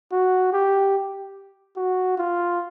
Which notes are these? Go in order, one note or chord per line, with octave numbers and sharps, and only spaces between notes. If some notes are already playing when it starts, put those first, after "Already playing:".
F#4
G4
F#4
F4